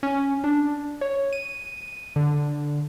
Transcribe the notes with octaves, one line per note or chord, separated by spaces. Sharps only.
C#4
D4
C#5
D#7
D3